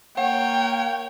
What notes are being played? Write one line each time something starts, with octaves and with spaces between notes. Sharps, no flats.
A#3 C#5 F#5 G5